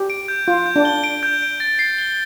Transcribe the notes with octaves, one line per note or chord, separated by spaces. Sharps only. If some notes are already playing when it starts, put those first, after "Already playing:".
Already playing: G4
D7
G6
F4 G6
G6
D4
G7
D7
G6
D7
A6
C7
G7